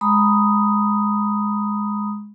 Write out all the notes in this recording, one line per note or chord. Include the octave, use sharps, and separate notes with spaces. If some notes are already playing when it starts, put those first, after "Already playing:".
G#3 A#5 B5 D#6